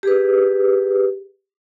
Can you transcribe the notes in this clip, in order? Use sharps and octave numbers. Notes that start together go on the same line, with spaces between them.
G4 G#4 B4